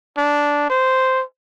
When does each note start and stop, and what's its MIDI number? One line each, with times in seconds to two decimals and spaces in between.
0.18 0.67 62
0.70 1.23 72